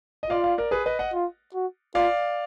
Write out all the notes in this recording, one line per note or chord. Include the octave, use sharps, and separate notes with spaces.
D#5
F4 D5 F5
D5 F5
A#4 D5
G#4 B4
B4 D#5
D#5 F#5
F4
F#4
F4 D5 F5